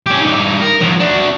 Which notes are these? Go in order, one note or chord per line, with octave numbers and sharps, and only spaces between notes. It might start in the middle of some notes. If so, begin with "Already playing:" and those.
C#4 G4
G2 D#4
A#4
F3 F#3
D4 F#4